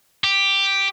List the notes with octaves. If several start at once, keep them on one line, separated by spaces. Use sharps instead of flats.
G4